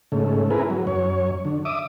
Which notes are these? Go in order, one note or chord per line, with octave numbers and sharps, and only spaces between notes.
G#2 C#3 A3
C4 E4 G#4 A#4 B4
F#3
F#2 C#5
D3
E5 D6 D#6